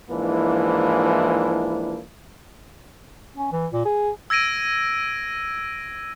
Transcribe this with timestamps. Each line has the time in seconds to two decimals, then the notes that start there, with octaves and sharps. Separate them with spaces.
0.10 G#2 E3 F3 A#3 D4 E4
3.37 C#4
3.53 E3
3.73 A#2
3.85 G#4
4.30 E6 G#6 A#6 D7 D#7